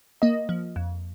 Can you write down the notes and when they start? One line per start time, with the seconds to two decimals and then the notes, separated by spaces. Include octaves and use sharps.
0.22 A#3 D#5
0.49 F3
0.76 F2